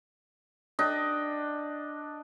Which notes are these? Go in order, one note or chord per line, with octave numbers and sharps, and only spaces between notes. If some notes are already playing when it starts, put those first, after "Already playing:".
D4 D#5 G5